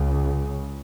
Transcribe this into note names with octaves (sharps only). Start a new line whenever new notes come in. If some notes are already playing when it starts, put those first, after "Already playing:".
Already playing: C#2 C#3